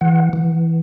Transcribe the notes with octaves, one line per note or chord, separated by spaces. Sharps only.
E3 F#5
E3